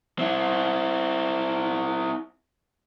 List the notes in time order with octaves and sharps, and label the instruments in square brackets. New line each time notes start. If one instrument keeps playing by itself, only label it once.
[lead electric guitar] C4 E4